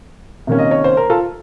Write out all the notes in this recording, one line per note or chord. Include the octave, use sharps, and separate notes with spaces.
C3 D#3 A#3 C#4
D#5
C#5
C5
A#4
F4 A4